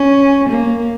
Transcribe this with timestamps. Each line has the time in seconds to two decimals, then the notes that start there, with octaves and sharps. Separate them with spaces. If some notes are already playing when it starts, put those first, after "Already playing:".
Already playing: C#4
0.49 A#3